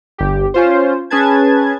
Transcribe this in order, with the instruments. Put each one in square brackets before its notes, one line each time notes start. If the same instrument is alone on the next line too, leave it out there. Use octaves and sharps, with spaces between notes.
[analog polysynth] G1 G4
C#4 F4 C5
C#4 G#4 B4 A5 G#6